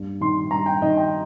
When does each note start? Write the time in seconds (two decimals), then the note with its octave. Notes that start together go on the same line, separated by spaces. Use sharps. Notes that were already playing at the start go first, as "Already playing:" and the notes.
Already playing: G2 A#3
0.21 D#3 C6
0.51 G2 A#5
0.66 G5
0.82 D#3 D#5
0.97 G5